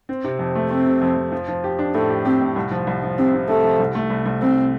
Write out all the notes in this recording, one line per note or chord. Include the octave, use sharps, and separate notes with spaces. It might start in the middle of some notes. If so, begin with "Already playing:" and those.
C4
C3
F2
A3
A3 C4
C3
F2
F2
F3
F3
G4
D4
A2 A3
G4
C4 G4
A2
C2
F3
C2
F3
C3 C4
C3
C3 A3
F3
C2
A3
C2
C2
C2 C4